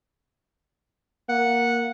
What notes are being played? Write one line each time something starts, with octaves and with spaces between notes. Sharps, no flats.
A#3 F#5